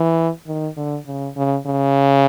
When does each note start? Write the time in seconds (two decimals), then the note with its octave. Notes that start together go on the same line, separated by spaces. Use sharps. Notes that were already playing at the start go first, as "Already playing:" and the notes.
Already playing: E3
0.47 D#3
0.77 D3
1.07 C#3
1.37 C#3
1.67 C#3